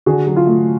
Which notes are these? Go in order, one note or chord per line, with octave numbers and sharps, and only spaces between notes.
D3 F#4 G#4
F#3
F4
A3